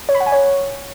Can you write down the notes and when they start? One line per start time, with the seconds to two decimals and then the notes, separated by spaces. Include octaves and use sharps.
0.09 C#5
0.15 B5
0.20 F#5
0.26 G#5
0.32 C#5